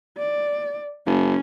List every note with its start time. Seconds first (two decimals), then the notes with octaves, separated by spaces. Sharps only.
0.18 D5
1.07 F#1 C#4